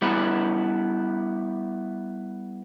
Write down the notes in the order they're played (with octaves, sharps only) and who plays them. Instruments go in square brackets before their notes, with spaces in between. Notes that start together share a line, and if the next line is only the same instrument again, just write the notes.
[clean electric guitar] G3 B3 E4 B4